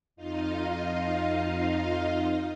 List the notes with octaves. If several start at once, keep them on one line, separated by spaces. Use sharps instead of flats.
F2 D#4 F4 D#5 F5